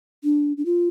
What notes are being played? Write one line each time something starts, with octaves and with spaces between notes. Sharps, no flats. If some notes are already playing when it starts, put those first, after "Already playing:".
D4
D4
F4